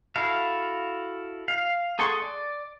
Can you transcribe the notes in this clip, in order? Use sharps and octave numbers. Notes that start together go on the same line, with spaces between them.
E4 F#4 A4 F5
F5
G#4 A4 F#5 C6 C#6
D5